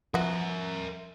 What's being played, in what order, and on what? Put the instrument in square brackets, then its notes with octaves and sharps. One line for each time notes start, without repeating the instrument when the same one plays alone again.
[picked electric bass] F3 [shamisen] B3 F#4 [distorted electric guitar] A#4 E5